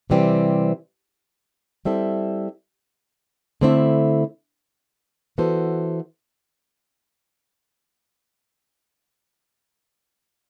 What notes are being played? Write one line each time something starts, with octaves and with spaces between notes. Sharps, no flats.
C3 E3 G3 C4
G3 C4 E4 A4 E5
D3 A3 C4 E4
E3 B3 F#4 A4 C5